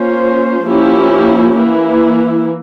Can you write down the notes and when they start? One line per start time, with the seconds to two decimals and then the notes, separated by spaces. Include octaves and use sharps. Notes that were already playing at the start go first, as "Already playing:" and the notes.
Already playing: A#3 C#4 F4 C5
0.64 F3 A#3 C#4 E4 G4
1.56 E3 A#3 E4